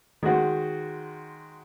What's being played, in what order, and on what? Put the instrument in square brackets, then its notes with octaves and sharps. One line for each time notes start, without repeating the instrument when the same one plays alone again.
[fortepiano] D#3 G#3 F#4 C5